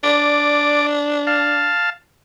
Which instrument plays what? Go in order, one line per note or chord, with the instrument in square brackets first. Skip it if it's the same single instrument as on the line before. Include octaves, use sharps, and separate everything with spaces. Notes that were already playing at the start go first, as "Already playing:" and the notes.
[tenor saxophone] D4 [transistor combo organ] D5 D6
[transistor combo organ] F5 A5